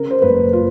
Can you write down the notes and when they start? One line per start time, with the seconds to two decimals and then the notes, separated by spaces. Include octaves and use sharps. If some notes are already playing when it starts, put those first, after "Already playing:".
Already playing: C#3 A#4
0.11 C5
0.22 F#1 B4
0.53 F4